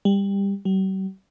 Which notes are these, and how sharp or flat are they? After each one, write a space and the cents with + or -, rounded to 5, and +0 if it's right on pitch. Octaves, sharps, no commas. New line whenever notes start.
G3 +20
G3 -45